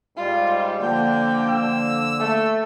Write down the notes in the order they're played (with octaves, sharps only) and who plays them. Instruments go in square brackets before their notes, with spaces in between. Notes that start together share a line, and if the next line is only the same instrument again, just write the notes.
[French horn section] G#2 G3 [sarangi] F4
[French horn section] D3 [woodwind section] F3 A#3 [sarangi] G5
[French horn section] D3 [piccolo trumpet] E6
[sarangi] A3